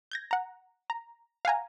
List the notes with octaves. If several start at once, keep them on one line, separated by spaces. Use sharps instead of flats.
G6 G#6 A#6
F#5 A#5
A#5
F5 F#5 G#5 A#5